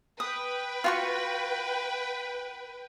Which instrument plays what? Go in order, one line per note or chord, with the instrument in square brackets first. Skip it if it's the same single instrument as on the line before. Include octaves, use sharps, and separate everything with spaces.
[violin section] B4 G5 [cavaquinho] D#6
[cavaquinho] F4 F#4 C#6